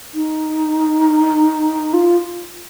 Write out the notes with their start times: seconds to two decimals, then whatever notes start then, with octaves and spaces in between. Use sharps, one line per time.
0.15 D#4
1.94 F4